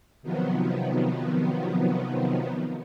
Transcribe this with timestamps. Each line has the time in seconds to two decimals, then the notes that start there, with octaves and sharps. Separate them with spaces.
0.22 C3 D#3 F3 F#3 B3